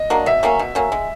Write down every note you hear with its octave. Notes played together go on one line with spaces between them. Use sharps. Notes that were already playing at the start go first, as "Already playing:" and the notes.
Already playing: D#5
F#3 A#3 D4
B2 E5
F#3 A#3 C#4
B2
F#3 A#3 C#4
G#3